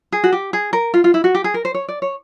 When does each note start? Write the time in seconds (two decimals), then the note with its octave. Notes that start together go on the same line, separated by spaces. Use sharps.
0.12 G#4
0.24 F#4
0.32 G4
0.53 G#4
0.73 A#4
0.94 F4
1.04 F4
1.14 E4
1.24 F#4
1.35 G4
1.44 G#4
1.54 A#4
1.65 C5
1.74 C#5
1.88 D5
2.02 C#5